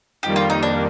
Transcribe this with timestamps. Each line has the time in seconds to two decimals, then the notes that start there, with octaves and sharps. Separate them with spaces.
0.23 F2 D#3 G3 A#3 G4
0.36 F4
0.50 D#4
0.63 D4